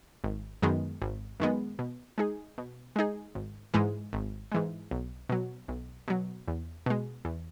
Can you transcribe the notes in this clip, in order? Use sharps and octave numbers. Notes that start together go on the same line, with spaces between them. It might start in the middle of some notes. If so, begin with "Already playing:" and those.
G#1
F#2 D#3 G#3 B3
G#1
F#2 D#3 G#3 B3
B2
G#3 D#4 G#4
B2
G#3 D#4 G#4
G#1
G#2 E3 G#3
G#1
G#2 E3 G#3
B1
B2 F#3
B1
B2 F#3
E2
B2 G#3
E2